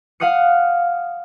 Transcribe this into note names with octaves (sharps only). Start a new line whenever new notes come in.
F5 F#5 D#6 F#6 C#7